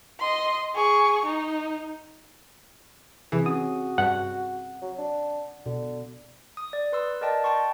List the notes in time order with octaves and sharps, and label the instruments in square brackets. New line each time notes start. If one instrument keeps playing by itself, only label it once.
[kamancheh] D#5 C6
G#4 C#6
D#4
[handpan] C3 G#4 [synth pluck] E3
[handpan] C#4 [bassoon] F#4 [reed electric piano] D#6
[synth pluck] G2 [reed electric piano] F#5
[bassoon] F#3
D4
[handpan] B2 [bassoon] D3
[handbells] D#6
D5
B4 C6 E6
A#4 D5 D#5 G5 A5
G5 A5 C6 C#6